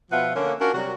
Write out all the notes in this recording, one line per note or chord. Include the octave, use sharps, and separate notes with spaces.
B2 F3 F4 B4 E5 F#5
D3 A#3 C#4
C#4 D4 F4 F#4 A#4
C3 F#3 G3 F#4